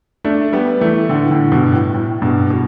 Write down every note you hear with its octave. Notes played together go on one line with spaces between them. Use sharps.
A3 D4
G3 B3
E3 A3
A2 D3
A2 D3
G2 B2
A2
A2
G2 B2
B2